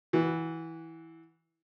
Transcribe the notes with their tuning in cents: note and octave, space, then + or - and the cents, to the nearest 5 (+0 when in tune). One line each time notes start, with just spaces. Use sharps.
E3 -10 F#4 +0